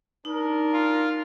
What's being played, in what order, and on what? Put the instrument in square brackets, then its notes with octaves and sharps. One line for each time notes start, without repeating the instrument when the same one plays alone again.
[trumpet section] D4 A#4 [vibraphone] D#4
[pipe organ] F4